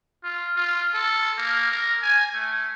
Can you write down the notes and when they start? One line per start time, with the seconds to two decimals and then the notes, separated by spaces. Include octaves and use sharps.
0.24 F4
0.56 F4
0.94 A4
1.38 A#3
1.72 A#4
2.02 G#5
2.34 A3